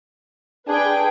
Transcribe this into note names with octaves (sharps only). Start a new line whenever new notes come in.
D4 G#4 B4 G5